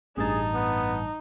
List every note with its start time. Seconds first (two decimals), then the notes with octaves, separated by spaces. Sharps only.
0.17 A1 G2 D#4 G#4 A5
0.54 B3